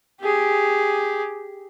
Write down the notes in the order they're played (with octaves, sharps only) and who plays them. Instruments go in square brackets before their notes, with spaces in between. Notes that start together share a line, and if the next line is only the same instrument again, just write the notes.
[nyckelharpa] G4 G#4